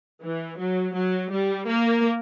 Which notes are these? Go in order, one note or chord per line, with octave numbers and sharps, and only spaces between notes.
E3
F#3
F#3
G3
A#3